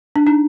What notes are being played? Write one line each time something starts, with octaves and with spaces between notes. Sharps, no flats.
D4
D4 D#4